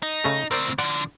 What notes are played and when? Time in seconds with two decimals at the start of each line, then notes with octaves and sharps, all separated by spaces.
0.03 D#4
0.24 C#3 A3
0.51 D2 C4 A#4 C5 D5
0.78 D3 F3 D5 F#5